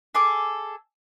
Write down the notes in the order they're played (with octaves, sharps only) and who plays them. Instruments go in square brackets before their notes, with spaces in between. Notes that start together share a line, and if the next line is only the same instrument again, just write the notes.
[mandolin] G#4 A4 D6